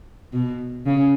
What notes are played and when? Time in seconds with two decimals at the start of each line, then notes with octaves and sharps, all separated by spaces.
0.33 B2
0.86 C#3